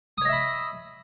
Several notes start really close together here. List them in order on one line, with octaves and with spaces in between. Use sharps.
D#6 C#5 D#5 E5 B5